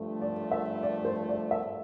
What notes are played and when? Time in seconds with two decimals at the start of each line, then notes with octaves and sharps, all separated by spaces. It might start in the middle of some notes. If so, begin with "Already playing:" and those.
Already playing: G2 F3 A3
0.22 D5
0.51 E5
0.83 D5
1.05 C5
1.29 D5
1.51 E5